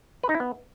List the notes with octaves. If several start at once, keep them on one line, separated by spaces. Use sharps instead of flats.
B4
D#4
E4
B3